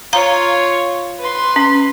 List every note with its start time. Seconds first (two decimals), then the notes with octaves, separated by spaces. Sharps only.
0.13 F4 C#5 F5 A#5
1.19 B4 C6
1.56 C#4